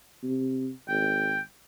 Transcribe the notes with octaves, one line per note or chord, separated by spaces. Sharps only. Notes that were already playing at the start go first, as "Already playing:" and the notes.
C3
G#1 G5